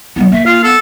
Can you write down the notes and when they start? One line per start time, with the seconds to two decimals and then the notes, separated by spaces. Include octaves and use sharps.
0.16 F#3 B3 E4
0.32 A#3 E5
0.46 F4 F5
0.64 B3 A4